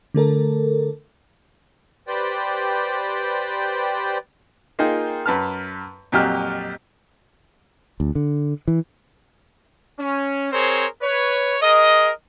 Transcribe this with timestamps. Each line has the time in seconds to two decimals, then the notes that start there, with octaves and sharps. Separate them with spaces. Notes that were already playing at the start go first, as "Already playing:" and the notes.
0.14 D3 A3 A4 A#4
2.08 G4 B4 C5 D5 G5
4.79 A#3 D#4 F4 G#4 G5
5.26 F#2 B4 A5 F6
6.12 F2 A#2 F#3 G4 D#5 F6
8.00 D2
8.15 D3
8.68 E3
9.99 C#4
10.52 C4 G#4 A#4 C5 C#5
11.02 B4 C#5
11.62 G#4 A#4 D#5